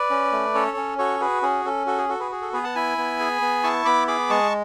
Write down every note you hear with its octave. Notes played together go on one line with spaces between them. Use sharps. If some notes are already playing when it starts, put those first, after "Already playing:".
Already playing: B4 D5
C#4
A3
C#4 A4 C#5
C#4
F#4 A4 C#5
F#4 G#4 B4
C#4 G#4
C#4 A4
F#4 A4
G#4
F#4 A4
G#4 B4
G#4
A4
B3 G#4 B4
F#5 A5
E4 G#5 B5
B3
G#4
B3
E4 A5 C#6
B3 B5 D6
G#4 B5 D6
G#3 A5 C#6